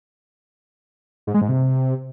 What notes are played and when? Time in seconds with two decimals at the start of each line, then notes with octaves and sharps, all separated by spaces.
1.27 G#2
1.34 G#3
1.41 G#2
1.49 C3